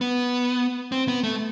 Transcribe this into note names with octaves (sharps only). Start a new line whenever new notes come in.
B3
C4
B3
A3